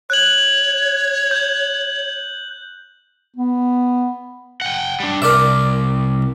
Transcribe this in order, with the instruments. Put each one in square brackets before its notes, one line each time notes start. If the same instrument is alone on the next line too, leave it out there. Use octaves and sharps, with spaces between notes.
[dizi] C#5 [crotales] F#6 F#7
[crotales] G6
[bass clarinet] B3
[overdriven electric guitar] F#5 G5
G3 D4
[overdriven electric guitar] C2 [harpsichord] A#4 D5 E5